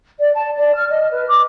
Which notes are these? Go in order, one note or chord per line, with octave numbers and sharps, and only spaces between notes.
D5
A5
D5
F6
D#5
B4
D6